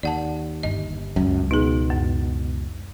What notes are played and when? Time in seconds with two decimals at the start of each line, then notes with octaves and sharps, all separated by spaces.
0.03 D#2 D5 F#5 A5
0.63 G1 D#5
1.16 C#2 F#2
1.51 B2 D#4 G#4
1.90 F#2